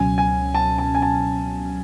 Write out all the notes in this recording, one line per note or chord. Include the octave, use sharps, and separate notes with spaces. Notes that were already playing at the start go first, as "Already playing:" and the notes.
Already playing: C#2 B2 F#3 C#4 G#5
G#5
A5
A5
G#5
A5